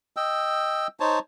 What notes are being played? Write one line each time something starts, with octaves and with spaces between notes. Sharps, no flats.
D#5 G5 E6
D#4 C5 C#5 A5